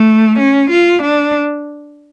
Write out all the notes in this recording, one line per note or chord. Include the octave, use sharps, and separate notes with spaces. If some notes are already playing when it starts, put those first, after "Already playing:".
Already playing: A3
C#4
F4
D4